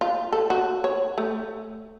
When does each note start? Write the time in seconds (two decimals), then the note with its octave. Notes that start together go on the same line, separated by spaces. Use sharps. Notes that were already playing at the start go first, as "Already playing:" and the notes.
0.01 F4
0.32 A4
0.50 F#4
0.84 C#5
1.18 A3